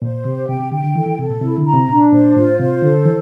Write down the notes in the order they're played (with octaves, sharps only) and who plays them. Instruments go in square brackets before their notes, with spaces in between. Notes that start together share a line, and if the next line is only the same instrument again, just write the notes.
[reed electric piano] A#2 [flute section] C5
[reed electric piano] C3 [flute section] G4
[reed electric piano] C3 [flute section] G5
[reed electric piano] C3
[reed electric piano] D3 [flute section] G5
[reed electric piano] D3
[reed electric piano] E3 [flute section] A4
[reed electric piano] E3
[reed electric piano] C3 [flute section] A4
[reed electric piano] A#2
[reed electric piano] C3 [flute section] E4
[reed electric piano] D3
[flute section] A#5
[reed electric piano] C3
[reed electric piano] A#2 [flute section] D4
[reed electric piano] A#2 [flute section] C5
[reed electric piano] A2 [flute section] F4
[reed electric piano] C3 [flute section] C5
[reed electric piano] D3 [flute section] A4
[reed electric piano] E3